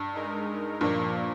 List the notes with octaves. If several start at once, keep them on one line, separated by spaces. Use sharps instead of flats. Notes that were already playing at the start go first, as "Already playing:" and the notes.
Already playing: G2
G#3 D#4 A#4
G2 A#2 F3 A#3